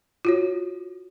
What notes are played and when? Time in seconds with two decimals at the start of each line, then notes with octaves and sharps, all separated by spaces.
0.25 F4 F#4 C#5